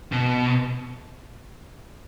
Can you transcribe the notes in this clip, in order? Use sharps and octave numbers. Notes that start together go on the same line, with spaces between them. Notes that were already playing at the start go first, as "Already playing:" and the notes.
B2